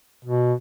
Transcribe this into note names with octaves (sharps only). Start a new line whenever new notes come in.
B2